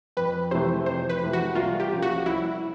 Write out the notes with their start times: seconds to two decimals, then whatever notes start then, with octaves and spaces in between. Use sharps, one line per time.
0.17 F2 B4
0.51 C3 E3 A3 C5
0.86 F2 C5
1.09 B4
1.22 C3 E3 A3
1.33 F#4
1.55 C2 F4
1.80 G4
1.91 A#2 F3 A#3 C#4
2.02 F#4
2.25 C2 E4